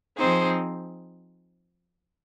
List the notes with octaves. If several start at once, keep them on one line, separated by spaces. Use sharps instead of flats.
F3 C4 D#4 G#4 C5